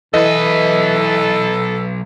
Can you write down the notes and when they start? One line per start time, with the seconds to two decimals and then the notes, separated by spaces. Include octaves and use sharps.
0.14 B1 E3 A4 B4 D#5